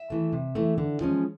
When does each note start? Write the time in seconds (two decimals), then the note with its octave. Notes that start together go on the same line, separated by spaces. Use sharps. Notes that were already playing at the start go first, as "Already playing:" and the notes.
Already playing: E5
0.10 E3 A3
0.33 C3
0.55 E3 A3
0.78 D3
1.01 F3 G#3 C#4